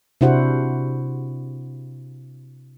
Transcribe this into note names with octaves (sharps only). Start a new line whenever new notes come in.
C3 D4 E4 F#4 C5 F#5